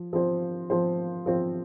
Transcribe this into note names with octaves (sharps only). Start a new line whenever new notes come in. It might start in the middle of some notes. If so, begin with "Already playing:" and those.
Already playing: F3
F3 C4 F4 C5
F3 C4 F4 C5
F3 C4 F4 C5